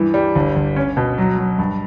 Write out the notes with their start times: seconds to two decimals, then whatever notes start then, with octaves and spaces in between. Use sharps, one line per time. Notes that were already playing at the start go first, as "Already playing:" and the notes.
Already playing: G2 E3
0.14 G3
0.35 G1
0.56 G1
0.76 C#4
0.97 B2
1.18 F#3
1.38 F#3
1.58 G2